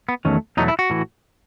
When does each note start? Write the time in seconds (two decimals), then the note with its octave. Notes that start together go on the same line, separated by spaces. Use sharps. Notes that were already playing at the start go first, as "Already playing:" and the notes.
0.09 B3
0.25 E2 D#3 F#3 A3 C#4
0.57 E2 B2 F#3 A3 D#4
0.68 E4
0.79 F#4
0.90 A2 E3